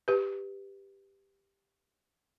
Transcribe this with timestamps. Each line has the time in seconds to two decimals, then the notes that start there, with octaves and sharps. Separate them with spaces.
0.08 G4 B4